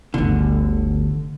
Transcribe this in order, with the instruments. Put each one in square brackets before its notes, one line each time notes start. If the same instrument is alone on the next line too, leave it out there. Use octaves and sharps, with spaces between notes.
[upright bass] G1 D2 [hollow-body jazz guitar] D3